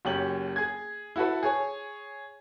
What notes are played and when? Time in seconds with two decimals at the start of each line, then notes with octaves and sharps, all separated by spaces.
0.05 F#1 F#2 C#4 G4 F#7
0.56 G#4 G#6
1.16 E4 F#4 A4 B4
1.43 G#4 C#5 G#5